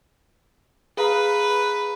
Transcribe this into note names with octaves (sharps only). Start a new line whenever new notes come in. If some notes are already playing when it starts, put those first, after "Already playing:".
G#4 B4 F5 A#5